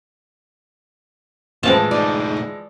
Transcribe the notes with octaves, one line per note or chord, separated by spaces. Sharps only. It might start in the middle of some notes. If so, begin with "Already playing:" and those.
A2 E3 F3 G#3 C4 C#4 F4 A5
A2 D#4 D5